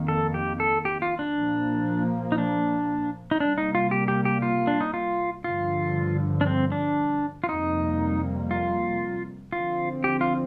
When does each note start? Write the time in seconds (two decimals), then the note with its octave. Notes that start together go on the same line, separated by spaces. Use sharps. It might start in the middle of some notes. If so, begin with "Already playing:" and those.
Already playing: F2 D#3 A#3
0.08 A4
0.34 G4
0.60 A4
0.85 G4
1.02 F4
1.19 D4
1.36 A#2 F3 A#3
2.32 D#4
2.38 D4
3.31 D#4
3.40 C3 G3 A#3 D4
3.58 D#4
3.75 F4
3.91 G4
4.08 G4
4.25 G4
4.42 F4
4.67 D4
4.81 D#4
4.94 F4
5.44 G2 D3 F3 F4
6.41 D4
6.47 C4
6.72 D4
7.44 F4
7.49 F2 C3 G3 A#3 D#4
8.51 F4
9.52 D3 F3 C4 F4
10.04 G4
10.21 F4